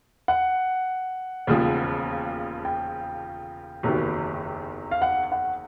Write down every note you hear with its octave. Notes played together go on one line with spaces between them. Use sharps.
F#5
E1 D#2 C#3 F3
G5
F#1 E2 C3 D#3 F#3
F5
F#5
F#5